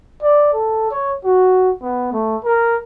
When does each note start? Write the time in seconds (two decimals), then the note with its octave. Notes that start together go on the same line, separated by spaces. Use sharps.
0.23 D5
0.53 A4
0.91 C#5
1.25 F#4
1.82 B3
2.13 A3
2.44 A#4